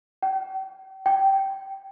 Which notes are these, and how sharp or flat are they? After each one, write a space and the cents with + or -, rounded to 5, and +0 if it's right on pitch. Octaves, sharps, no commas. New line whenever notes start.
G5 -40
G5 -15